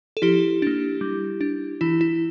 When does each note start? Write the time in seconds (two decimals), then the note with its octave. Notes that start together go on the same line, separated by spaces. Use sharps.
0.17 A4
0.22 F3 E4 G4
0.62 A#3 D4
1.01 G3
1.41 D4
1.81 E3 E4
2.01 E4